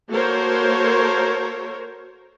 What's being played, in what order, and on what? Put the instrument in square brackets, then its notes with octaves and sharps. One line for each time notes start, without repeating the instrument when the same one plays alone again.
[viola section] A#3 F#4 A4 A#4 C5 C#5